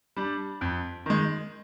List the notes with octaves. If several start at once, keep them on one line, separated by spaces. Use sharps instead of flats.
G3 D4
F2
D#3 G#3